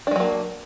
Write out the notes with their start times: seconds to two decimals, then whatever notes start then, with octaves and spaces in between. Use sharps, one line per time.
0.07 D4
0.11 G#3
0.16 F#3
0.20 A#3